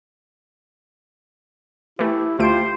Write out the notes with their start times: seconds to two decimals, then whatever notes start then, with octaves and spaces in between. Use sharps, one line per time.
1.99 E3 A3 E4 G4
2.39 D2 A3 F4 G4 C5 D7